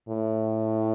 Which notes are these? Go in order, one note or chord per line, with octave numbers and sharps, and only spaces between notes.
A2